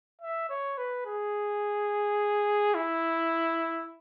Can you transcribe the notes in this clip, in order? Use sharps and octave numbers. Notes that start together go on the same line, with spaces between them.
E5
C#5
B4
G#4
E4